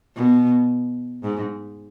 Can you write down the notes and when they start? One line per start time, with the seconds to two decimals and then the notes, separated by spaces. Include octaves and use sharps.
0.16 B2
1.23 G#2